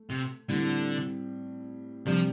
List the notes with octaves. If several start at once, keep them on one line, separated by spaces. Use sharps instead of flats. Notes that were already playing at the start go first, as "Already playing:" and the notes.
Already playing: A3
C3
A2 D3 G3 C4
C3 F3 G3 D4